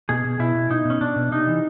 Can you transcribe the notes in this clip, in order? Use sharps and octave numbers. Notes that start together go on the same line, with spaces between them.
B2 G#4
B2
B2 E4
B2
B2 D#4
B2
C#4
B2 D4
B2
C3 D#4
E3